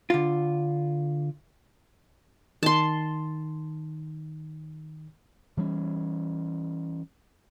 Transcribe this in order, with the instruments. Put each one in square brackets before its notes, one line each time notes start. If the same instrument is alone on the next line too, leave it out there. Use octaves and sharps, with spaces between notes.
[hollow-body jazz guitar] D3 F4
[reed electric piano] D#3 [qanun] A5 C6
[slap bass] E3 G3 G#3 C#4